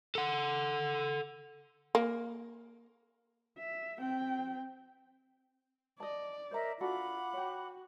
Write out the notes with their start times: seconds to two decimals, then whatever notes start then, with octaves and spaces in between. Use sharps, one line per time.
0.15 A4 F#5
1.95 A#3
3.58 E5
3.98 C4 G5
6.00 D5 D#5 A5
6.51 A#4 C5 C#5 D#5 E5 A#5
6.81 D4 F4 F#4 A4 F#5 B5 D6
7.33 F#4 C#5 G5